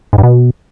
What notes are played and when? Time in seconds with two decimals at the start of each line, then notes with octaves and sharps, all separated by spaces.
0.13 G#2
0.18 G2
0.23 B2